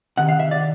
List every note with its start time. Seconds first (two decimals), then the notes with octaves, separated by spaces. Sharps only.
0.17 C3 D#3 F#5
0.29 F5
0.39 E5
0.51 D5